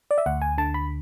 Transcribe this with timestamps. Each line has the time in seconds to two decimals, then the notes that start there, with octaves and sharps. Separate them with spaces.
0.11 D5
0.18 E5
0.26 D2 F#5
0.42 G#5
0.58 D3 A5
0.74 B5